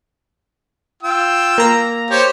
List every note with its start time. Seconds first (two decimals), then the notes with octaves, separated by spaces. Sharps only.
1.03 F4 G5 E6
1.58 A#3 A#5
2.10 G4 C5 C#5